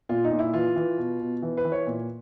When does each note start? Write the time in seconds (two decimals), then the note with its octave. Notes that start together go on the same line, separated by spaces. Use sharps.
0.09 A#2 F4
0.24 D#4
0.31 A#2
0.39 E4
0.54 E3 F4
0.76 E3
0.98 B2
1.20 B2
1.42 E3
1.57 B4
1.65 E3
1.72 C#5
1.87 A#2